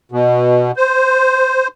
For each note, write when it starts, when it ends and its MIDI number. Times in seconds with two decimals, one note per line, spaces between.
0.12 0.72 47
0.77 1.68 72